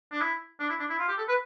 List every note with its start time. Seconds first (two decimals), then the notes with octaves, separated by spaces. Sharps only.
0.12 D4
0.21 E4
0.60 D4
0.70 E4
0.80 D4
0.90 E4
0.99 F4
1.08 G4
1.18 A4
1.28 B4